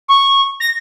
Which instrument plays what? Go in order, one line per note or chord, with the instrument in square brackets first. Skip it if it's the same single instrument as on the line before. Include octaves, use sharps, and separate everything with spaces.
[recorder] C#6
A#6